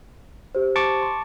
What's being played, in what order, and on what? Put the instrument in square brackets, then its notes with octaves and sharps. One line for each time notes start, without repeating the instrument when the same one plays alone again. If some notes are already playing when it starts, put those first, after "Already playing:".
[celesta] G4 C5
[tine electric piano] A5 C#6 D6
[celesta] C6